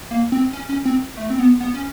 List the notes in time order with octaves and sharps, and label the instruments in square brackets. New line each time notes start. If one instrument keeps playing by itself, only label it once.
[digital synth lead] A#3
C4
C#4
C#4
C4
A3
C4
B3
B3
C#4